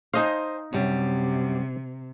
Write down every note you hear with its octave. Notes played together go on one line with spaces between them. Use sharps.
D#4 C5 D#5 F5 G#5
F#2 C3 G3